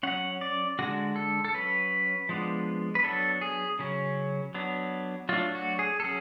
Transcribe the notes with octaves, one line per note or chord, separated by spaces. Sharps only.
F#3 C#4 F#5
D5
D3 G#3 D4 F#4
A4
A4
F#3 C#4 B4
F3 G#3 B3 D4
B4
F#3 B3 D4 A4
G#4
C#3 F#3 C#4
F#3 B3 D4
F#3 A3 D4 F4
F#4
G#4
A4
F#3 C#4 G#4